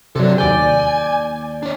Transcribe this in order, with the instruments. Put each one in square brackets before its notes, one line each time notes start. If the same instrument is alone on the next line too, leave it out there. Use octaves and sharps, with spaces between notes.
[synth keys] C3 F#3 [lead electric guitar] A4 D5
[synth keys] D#2 D5 G6 [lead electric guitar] G#5
[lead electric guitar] D4 C#5